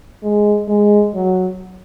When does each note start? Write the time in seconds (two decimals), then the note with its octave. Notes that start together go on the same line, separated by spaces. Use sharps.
0.23 G#3
0.68 G#3
1.14 F#3